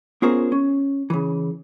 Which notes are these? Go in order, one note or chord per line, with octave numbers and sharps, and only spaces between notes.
B3 C#4 F4 G#4 A#4 C5
C#4
C#3 E3